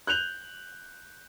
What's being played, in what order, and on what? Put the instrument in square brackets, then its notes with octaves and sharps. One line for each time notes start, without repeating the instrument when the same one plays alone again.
[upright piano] F#6 G6 F7 F#7